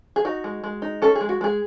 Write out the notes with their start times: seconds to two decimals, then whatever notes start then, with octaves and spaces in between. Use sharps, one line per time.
0.16 G#4
0.25 D#4 F#4
0.44 G#3
0.64 G#3
0.82 D#4
1.02 C#4 A4
1.15 G#4
1.21 G#3
1.29 F#4
1.41 G#3 G#4